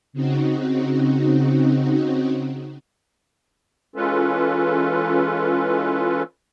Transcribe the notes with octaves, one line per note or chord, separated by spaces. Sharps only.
C#3 C4 D#4 F#4
E3 G#3 C#4 F4 A4 B4